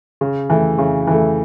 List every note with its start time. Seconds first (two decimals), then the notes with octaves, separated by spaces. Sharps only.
0.21 C#3
0.50 E3 A3
0.78 C#3
1.07 E3 A3